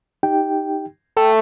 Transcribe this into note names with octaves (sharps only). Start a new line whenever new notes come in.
D#4 G4 G5
A3 G5